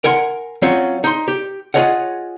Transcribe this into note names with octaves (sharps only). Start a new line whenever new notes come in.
A#4 F#5 G#5 C6
F#3 C4 C#4 F4 C#5
D#4 C6
G4
F4 G#4 C#5 D#5 F#5